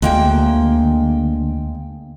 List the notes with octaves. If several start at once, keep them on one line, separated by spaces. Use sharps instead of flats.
D2 G#3 A#3 G5